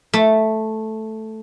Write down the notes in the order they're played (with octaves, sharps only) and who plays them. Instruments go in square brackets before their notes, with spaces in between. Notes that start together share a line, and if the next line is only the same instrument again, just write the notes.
[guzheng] A3